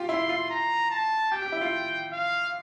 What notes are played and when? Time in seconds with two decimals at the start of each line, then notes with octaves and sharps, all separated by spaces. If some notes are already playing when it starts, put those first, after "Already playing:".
Already playing: F4 G4
0.09 E4 C6
0.29 F4
0.50 A#5
0.91 A5
1.32 G4 G5
1.42 G4
1.52 E4
1.61 F4
2.12 F5